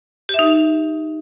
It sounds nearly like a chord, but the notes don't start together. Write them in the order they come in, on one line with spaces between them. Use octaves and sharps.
G4 E5 D#4